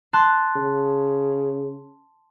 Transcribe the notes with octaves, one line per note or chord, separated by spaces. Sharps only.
A5 C6 F#6
C#3